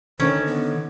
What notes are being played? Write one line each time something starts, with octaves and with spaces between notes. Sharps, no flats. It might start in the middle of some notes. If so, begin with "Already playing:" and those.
D3 D#3 C#4 C5
B3